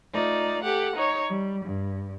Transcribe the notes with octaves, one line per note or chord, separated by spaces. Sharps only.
A3 D#4 F4 D5
G4 A4 F#5
D#4 C#5
G3
G2